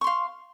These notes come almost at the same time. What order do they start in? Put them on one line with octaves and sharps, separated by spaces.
C#6 C6 F5